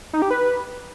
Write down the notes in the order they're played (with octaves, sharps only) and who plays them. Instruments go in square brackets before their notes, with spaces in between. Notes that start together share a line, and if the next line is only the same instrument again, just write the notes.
[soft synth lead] D#4
G4
B4